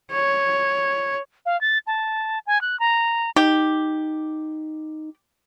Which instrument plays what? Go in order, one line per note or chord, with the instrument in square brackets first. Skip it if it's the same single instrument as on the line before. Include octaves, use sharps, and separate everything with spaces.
[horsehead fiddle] C#5
[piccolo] F5
A6
A5
G#5
F#6
A#5
[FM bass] D#4 [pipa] G4